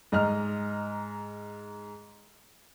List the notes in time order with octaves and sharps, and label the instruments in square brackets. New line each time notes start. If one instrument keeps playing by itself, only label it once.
[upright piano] G#2 D#5 A#5 F6